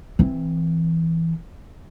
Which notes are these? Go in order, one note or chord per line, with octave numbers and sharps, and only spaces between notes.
E3 C4